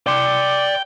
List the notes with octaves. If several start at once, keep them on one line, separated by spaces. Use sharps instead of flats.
D5 G5 C6 D6